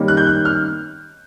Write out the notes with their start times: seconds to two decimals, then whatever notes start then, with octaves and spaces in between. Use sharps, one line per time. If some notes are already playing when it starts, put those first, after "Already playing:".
Already playing: D#3 G3 A#3 C#4
0.08 F#6
0.17 G6
0.27 F#6
0.45 F6